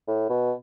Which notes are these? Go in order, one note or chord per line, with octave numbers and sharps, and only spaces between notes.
A2
B2